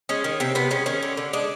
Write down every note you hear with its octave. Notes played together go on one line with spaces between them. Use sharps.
G#3 C#4
D#3
C3 C4
C3 B3
G#3 C#4
D#3 C#4
D3
D3
G#3 D4